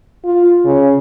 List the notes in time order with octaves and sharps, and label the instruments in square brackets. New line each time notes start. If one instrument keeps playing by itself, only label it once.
[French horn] F4
C#3